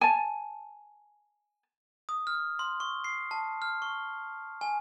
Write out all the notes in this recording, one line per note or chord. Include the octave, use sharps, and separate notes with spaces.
G#5 A5
D#6
F6
C6
C#6
C7
A5
F6
C#6
G#5